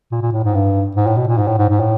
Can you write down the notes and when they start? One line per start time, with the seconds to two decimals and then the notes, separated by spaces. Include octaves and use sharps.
0.12 A#2
0.22 A#2
0.32 A2
0.44 G#2
0.54 G2
0.96 G#2
1.07 A2
1.17 B2
1.27 A#2
1.38 G#2
1.47 A2
1.58 G#2
1.69 G#2
1.80 A2